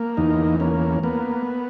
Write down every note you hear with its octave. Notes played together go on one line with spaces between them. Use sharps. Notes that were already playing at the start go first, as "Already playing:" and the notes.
Already playing: A#3
E2 D#4
A#3 C#4
A#3 B3